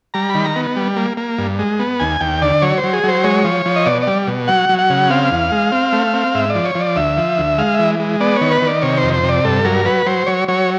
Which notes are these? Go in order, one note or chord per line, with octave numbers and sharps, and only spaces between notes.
G3 A#5
B5
D#3
A#5
B3
G3
A#3
A#3
G2
G#3
B3
D#2 G#5
D#2 G5
D3 D5
F#3 C#5
C5
F#3
G#4
F#3 C5
G#3 C#5
F3
F3
D#5
B2 D5
D5
G3
B2
F#3 F#5
F#3
F#5
C#3
C4 F5
E2
G#3
C4
A3
C4
G#2 E5
D5
F3
C#5
F3
D5
D2 E5
F3
D2
G#3 F5
E3 E5
G#3
B3 D5
D#3 C#5
B4
D#3
D5
C3 C#5
C5
F2
C5
C3
D5
G2 A4
F#3 A#4
F#3 B4
F#3 C5
F#3 C#5
F#3 C#5